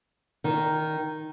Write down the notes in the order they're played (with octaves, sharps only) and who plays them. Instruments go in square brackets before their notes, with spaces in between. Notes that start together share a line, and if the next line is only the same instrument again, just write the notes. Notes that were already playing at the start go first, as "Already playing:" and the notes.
[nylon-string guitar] D#3